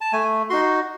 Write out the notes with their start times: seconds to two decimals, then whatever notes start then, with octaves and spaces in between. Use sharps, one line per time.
0.01 A5
0.13 A3 G#5
0.50 D#4 F#4 C6